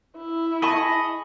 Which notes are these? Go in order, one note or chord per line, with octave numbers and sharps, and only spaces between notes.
E4
G#4 D#5 G#5 A5 B5 C#6